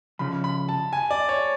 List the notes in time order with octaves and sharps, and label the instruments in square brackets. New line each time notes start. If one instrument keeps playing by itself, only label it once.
[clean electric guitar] C#2 C#3 F3 [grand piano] B5
[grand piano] B5
A5
G#5
D5
C#5